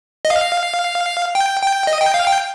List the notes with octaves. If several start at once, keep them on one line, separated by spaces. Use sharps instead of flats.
D#5
F5
G5
G5
D#5
G5
F5
G5